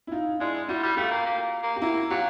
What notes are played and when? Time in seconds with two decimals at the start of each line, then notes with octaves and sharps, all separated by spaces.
0.07 E4
0.12 D#4 F4
0.40 G#3 D4 E4
0.69 G3 E4 F#4
0.83 G3
0.97 A3 F4 G4
1.11 A#3
1.26 A#3
1.63 A#3
1.76 G4
1.82 A#3 E4 F#4
2.10 F#3 F4 G4